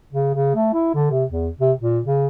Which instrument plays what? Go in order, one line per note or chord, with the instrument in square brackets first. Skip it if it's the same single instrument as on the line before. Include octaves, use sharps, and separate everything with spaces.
[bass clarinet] C#3
C#3
A3
E4
D3
C3
E2
C3
A#2
C#3